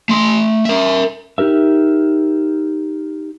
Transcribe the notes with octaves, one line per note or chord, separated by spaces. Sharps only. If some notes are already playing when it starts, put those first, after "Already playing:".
A3 C6
A#4 E5
D#4 G4 A#4 E5